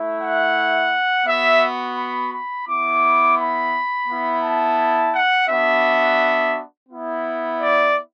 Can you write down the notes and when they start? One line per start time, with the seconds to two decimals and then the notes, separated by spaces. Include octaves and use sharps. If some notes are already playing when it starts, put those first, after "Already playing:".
Already playing: A3 E4
0.21 F#5
1.27 B3 F#4 E5
1.96 B5
2.32 B5
2.66 B3 E4 D6
3.38 B5
4.07 B3 E4
4.43 A5
5.14 F#5
5.48 B3 D4 F#4 E5
6.89 B3 E4
7.59 D5